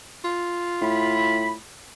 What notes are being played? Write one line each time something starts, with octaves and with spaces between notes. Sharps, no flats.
F4
A2 B5